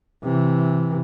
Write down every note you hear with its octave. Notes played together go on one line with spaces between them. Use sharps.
C3 E3